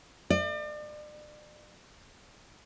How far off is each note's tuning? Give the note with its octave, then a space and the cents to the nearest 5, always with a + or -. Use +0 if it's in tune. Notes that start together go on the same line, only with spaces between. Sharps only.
D5 +40